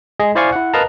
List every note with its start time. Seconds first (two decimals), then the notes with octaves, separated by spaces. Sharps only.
0.20 G#3 G#4 D#5
0.35 E4 C5 D5 F5 G#5 C#6
0.52 E4 F#5
0.74 A#4 B4 D#5 F5 A5 A#5